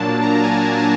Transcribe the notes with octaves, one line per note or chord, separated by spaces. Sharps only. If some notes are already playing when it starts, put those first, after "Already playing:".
Already playing: A#2 F#3 A#3 D4 A5
A#5
A5
G#5
A5